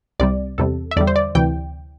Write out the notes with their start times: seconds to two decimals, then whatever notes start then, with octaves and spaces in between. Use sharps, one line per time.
0.19 C2 C3 G3 D5
0.58 E2 C3 G3 A4
0.91 E5
0.97 E2 D3 G3 D5
1.07 C5
1.16 D5
1.35 D2 C3 E3 G5